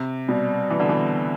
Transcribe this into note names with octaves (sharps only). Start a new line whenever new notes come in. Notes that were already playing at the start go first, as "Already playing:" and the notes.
Already playing: C3
B2 G3
E3
D3
E3